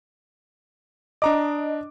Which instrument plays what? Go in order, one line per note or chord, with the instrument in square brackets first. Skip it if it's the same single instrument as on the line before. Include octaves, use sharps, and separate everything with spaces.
[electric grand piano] D4 A#5 D6 [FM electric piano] D#5